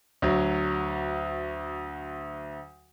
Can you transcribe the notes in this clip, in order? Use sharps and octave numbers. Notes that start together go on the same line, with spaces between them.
D2 F#3